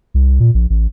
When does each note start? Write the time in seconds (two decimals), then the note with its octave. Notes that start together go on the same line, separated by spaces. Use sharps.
0.14 C2
0.40 A#2
0.54 A#1
0.70 A1